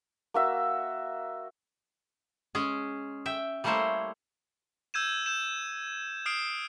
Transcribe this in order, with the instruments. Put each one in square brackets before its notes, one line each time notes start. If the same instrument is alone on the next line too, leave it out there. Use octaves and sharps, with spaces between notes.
[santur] A#3 F#4 E5
[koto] G#3 C#4 G#4
E5 G5
G3 A3 A#3 E4 C5 C#5
[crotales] E6 G6 G#6 D#7 E7
E6 G6 E7
D#6 F6 C7 D7